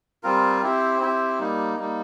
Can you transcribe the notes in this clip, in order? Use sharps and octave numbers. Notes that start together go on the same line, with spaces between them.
G3 C4 F4 A#4
C4 E4 G4 C5
C4 E4 G4 C5
G3 A#3 D#4
G3 A#3 D#4